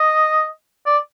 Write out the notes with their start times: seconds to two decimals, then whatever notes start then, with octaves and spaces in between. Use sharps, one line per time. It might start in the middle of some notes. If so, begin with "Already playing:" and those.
Already playing: D#5
0.86 D5